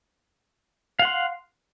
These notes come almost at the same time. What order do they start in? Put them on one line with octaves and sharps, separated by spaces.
F5 F#5 C6